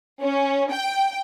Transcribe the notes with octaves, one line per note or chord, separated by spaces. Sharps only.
C#4
G5